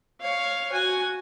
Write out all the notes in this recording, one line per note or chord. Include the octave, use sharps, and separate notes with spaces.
C#5 F5
F#4 G#5